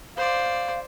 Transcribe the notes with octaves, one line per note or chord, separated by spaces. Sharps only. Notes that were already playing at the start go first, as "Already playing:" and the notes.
C5 D5 F5